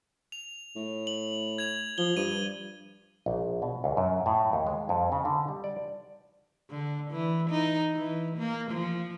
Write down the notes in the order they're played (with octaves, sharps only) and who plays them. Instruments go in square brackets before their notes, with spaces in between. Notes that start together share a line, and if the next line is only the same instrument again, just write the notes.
[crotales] F7
[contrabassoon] A2
[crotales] F#7
G#6 F7
[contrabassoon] F3 [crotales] G7
[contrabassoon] G2 [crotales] D#7
[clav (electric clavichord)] A#1
B2
C#2
F#2
A2
D#2
G#3
F2
C#3
D3
G3
D5
[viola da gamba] D3
E3
D#4
E3
A#3
F3